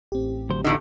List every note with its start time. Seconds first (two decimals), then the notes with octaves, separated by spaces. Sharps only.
0.12 A1 C4 G4
0.50 D2 F#3 C5
0.64 E2 A2 D3 D#4 F#4 D#5